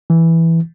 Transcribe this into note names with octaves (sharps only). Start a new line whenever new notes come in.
E3